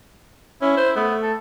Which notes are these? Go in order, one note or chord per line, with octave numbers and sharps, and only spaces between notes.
C#4 E4
C5
A3 B3
A4